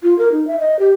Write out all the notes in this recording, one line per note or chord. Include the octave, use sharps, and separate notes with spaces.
F4
A#4
D#4
E5
D#5
G4